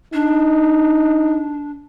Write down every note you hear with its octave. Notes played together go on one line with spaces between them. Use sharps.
D4 D#4